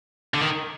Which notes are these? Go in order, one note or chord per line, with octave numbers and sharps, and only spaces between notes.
D3
D#3